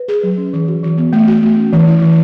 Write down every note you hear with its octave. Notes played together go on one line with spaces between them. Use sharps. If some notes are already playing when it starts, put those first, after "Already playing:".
Already playing: B4
G#4
F#3
C#4
E3
F#4
E3
B3
A3
F#4
A3
C#4
E3
E4
E3